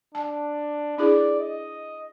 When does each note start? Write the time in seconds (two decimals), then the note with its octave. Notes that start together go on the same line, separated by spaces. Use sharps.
0.15 D4 A5
0.98 D4 E4 G#4 D5
1.40 D#5